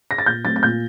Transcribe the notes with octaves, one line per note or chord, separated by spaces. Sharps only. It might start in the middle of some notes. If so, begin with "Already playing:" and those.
A#6
A6
A#2 G6
F#3 A3 C4 A6
A6
A#2 G6